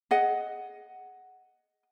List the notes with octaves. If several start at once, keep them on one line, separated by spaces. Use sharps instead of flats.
G#4 D#5 F#5